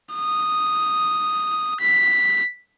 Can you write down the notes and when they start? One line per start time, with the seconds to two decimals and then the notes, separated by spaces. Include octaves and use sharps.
0.15 D#6
1.81 B6